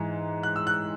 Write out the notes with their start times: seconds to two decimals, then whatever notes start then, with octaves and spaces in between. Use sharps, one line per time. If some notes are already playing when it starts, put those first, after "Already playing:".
Already playing: G#2 E3
0.43 F#6
0.56 E6
0.67 F#6